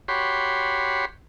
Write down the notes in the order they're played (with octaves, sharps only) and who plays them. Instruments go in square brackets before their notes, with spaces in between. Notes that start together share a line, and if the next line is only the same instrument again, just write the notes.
[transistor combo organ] F#4 G4 C#5 B5 C6